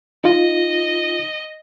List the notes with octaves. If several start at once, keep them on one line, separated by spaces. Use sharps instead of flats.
D#4 F4 D#5